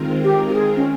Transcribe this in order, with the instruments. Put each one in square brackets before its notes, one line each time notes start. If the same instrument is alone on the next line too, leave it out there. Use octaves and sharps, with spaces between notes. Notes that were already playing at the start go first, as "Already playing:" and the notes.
Already playing: [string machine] D#3 G#3 C4 F4 A#4
[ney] G4
G4
G#4
C#4